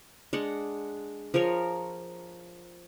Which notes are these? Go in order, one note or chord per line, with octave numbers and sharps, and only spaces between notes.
G#3 D4 F#5
F3 G#4 A#4 C#5